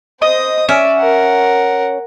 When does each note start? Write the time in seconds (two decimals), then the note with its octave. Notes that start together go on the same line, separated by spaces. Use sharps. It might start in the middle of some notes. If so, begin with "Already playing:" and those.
0.22 C5 D#5 D#6
0.69 C#4 D5 E5
0.98 A#4 F#5